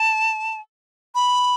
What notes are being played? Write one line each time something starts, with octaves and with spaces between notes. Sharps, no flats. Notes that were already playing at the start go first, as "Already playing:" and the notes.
Already playing: A5
B5